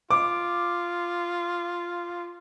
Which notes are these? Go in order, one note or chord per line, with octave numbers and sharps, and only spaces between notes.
F4 D6